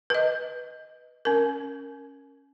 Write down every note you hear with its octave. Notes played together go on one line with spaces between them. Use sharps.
B4 D#5
C#4 A#4